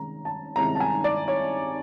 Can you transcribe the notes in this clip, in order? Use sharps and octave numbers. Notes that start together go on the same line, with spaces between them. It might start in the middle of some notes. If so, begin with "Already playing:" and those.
Already playing: C3 D#3 G#3 C#4 A#5
A5
C3 D#3 G#3 C#4 E4 A#5
A5
G#5
D5
C#5